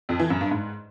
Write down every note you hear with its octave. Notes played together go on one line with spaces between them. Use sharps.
F2
E3
F#2
G2
G#2